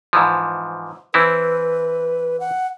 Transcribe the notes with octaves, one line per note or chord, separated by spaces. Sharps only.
G#2 E3 F3
E3 C4 E4 B4
F#5